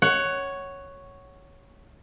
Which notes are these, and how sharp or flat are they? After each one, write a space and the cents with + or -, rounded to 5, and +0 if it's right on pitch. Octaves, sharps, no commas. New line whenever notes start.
C#5 +0 F#5 +15